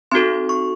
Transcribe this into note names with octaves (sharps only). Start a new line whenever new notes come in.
C4 D#4 F#4 A4 C6
C#6